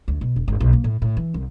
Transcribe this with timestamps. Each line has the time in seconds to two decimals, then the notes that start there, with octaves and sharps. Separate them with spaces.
0.08 D2
0.21 B2
0.36 E1
0.48 G#1
0.60 B1
0.73 A#3
0.84 A2
1.02 A2
1.17 E3
1.34 C2